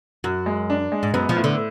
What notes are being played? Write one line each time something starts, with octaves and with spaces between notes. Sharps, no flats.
F#2 F#4
G#3
D4
G#3
G#2
F#2 B3
F3
A2
D3